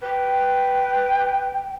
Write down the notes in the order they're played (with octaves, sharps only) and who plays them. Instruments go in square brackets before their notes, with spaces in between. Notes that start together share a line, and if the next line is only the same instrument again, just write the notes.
[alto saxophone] B4 [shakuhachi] G5